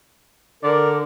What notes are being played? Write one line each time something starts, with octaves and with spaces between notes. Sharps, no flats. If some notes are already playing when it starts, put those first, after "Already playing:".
D3 A#4 D5